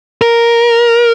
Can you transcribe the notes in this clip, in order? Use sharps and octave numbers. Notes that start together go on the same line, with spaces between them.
A#4